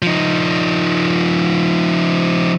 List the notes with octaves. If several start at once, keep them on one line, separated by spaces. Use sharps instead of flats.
F3 D#4